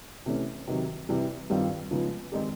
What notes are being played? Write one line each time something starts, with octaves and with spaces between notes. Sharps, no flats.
C3 E3 A3 C#4
C3 D#3 F#3
C3 E3 G3
G2 D#3 G3 C4 F4
C#3 F3 G#3 B3 D#4
D#3 G#3 C4 D#4 G4